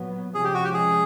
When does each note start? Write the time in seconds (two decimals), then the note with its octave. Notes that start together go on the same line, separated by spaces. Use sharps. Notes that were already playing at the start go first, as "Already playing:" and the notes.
Already playing: A#2 F#3 B3
0.34 C3 F3 G#3 C#4 G#4
0.44 G4
0.54 F#4
0.64 G4
0.74 G#4